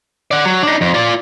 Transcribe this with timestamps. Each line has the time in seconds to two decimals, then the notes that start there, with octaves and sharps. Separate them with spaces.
0.31 D5 F#5
0.45 F#3
0.63 D4 D#4
0.81 F2
0.94 F4 D5